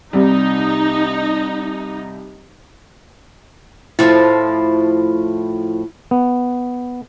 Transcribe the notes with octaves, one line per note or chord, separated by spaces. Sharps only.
C2 C3 G3 D#4
A2 F3 E4
B3